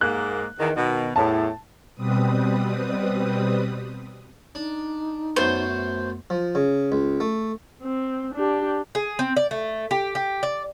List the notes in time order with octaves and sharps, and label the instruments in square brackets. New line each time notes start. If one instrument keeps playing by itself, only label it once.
[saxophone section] G#2 A#3 [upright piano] F#6
[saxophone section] E2 D#3
B2 D#3
[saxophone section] E2 A2 [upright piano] A5
[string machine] B2 G3 C4 B4 D#6
[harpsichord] D4 [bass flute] D#4
[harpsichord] F#2 A3 B3 [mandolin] C5
[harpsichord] F3
C#3
C#2
A3
[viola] C4
D4 G4
[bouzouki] G#4
C4
D5
A3
G4
G4
D5